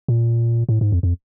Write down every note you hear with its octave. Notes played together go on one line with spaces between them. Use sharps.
A#2
A2
G#2
F2
F2